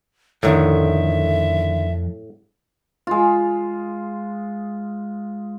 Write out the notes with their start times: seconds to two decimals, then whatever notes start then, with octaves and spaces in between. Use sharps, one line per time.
0.43 F2 A2 D3 D#3 E5
3.07 G#3 F4